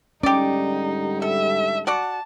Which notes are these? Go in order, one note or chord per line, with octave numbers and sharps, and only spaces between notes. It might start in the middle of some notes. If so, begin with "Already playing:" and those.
G#2 D3 G3 C#4 D#4 G4 D5
A4 E5
F#4 D5 F#5 A5